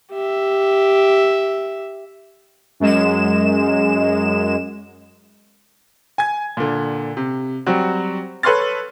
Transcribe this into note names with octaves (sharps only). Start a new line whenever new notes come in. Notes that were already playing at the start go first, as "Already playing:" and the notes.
G4 E5
F#2 G#3 E7
G#5 G#6
A#2 D3
C3
F#3 G3 C4 F#4
A4 B4 C#5 C6 F6 A6